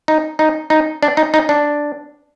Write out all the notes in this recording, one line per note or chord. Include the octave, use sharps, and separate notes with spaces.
D#4
D#4
D#4
D4
D#4
D#4
D4